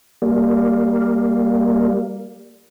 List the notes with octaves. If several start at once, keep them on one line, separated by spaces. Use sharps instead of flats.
G3 A#3